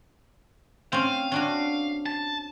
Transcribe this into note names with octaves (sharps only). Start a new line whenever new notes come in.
C4 C#4 F5
C#4 D4 F#4
A5